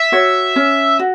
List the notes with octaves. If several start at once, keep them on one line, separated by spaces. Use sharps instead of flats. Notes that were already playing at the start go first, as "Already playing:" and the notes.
Already playing: E5
F#4 C#5
C#4
F#4